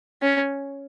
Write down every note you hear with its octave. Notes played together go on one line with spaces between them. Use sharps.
C#4